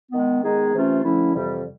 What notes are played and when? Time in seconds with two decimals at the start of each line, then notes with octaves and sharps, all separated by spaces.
0.12 D#3 G#3 B3
0.42 D#3 G#3 B3 D#4 G#4
0.73 C3 E3 A3 C#4 F4
1.03 D3 F3 A3 C#4 E4
1.33 F2 C3 E3 G3